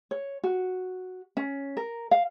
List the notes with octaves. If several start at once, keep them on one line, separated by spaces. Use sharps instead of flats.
C#5
F#4
C#4
A#4
F5